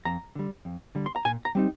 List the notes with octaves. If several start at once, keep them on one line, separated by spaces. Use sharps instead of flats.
F2 A#5
D3 G3
F2
D3 G3
C6
A#5
A#2 G#5
A#5
G3 C4 D#4